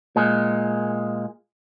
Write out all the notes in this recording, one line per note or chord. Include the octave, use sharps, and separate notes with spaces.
A#2 G#3